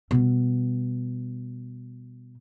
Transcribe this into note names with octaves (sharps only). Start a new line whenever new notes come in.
B2 G3